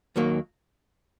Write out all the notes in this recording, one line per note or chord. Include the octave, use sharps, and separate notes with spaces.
D#2 D#3 F#3 A#3